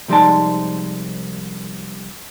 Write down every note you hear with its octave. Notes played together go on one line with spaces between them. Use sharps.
C2 F3 G#3 D#4 D5 A5